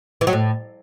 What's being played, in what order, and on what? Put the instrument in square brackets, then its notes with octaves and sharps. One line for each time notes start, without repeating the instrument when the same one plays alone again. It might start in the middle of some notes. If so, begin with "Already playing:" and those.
[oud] E3
F#3
A2